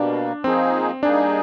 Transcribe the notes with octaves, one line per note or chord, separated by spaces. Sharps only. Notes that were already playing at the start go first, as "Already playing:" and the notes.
Already playing: B2 G3 A#3 D4
F3 A#3 C4 D#4 G#4
G3 A#3 D4 D#4 G#4